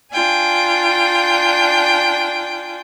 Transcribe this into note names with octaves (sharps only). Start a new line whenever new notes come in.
D4 F4 G5 G#5